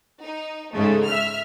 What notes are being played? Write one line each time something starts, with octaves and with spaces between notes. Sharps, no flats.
D#4
G#2 C#3 A3
E5 F6